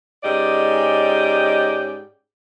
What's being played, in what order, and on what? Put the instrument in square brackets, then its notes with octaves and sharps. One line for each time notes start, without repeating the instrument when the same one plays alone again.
[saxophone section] G#2 C#4 G4 D5 D#5